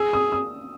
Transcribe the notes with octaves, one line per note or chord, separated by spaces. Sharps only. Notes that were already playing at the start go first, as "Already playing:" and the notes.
Already playing: G#4 E6
D#6
D#6